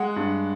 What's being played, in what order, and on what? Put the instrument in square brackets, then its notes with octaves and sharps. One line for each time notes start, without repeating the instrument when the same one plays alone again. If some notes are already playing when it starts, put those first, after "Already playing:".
Already playing: [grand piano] G#3 F#5
G2